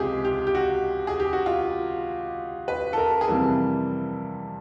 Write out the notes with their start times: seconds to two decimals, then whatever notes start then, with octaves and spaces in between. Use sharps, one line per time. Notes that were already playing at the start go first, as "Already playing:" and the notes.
Already playing: C#2 C3 F3 G#3 G4 G#4
0.25 G4
0.47 G4
0.55 F#4
1.07 G#4
1.20 G4
1.33 F#4
1.46 F4
2.68 B4
2.93 A4
2.98 A#4
3.21 G#4
3.28 F2 C3 E3 G3 A#3 A4